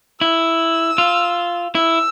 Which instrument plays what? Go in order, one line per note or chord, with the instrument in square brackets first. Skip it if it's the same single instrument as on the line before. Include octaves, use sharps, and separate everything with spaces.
[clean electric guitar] E4 [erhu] E6
[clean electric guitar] F4
[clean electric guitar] E4 [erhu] E6